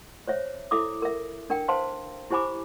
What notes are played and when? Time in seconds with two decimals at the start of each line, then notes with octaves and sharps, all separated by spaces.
0.27 C5 C#5 E5
0.71 E4 A4 E5 D6 D#6
1.02 A#4 E5
1.50 D4 A#4 G5
1.68 B4 C5 F5 A5 C6
2.30 E4 G4 C5 G#5 B5 D6